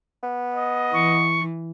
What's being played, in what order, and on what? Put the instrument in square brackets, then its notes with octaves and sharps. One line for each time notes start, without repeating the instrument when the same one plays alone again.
[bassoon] B3
[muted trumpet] D#5
[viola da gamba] E3 [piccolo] C#6